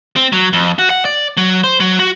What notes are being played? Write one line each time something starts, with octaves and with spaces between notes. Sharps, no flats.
C4
F#3
F2
F#4
F#5
D5
F#3
C5
F#3
F#4